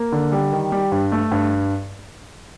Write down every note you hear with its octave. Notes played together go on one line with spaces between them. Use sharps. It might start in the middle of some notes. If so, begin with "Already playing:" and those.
Already playing: A#3
D3
G3
D#3
G3
G2
A3
G2